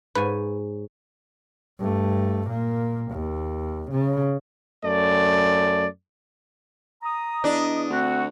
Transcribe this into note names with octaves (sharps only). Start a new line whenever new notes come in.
G#2 B4 C#5 G#5
G2 A3
A#2 A#3
D#2
C#3
F#2 A3 D5
A#5 D#6
E2 D4 D#5
D2 C4 F#4 F#5